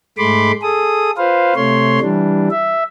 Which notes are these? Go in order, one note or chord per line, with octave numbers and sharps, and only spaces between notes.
G#2 G#3 A3 B5 C6 D6
G#4 A4 D#6
F4 B4 C5 F5
C3 A3 C#5 C6
E3 G3 D4
E5